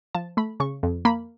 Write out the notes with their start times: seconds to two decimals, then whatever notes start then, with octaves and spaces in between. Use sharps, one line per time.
0.15 F3 A5
0.37 A3 B5
0.60 C#3 C#6
0.83 F2
1.05 A#3 B5